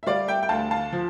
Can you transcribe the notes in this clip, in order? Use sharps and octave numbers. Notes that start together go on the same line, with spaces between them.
E5
G3 D5 F5
E5 G5
G5
D2 F5 A5
F5 A5
F3